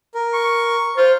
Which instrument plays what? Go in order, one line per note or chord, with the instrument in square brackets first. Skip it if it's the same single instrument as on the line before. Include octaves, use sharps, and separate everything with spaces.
[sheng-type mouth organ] A#4
[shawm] C#6
[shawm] F4 [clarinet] C5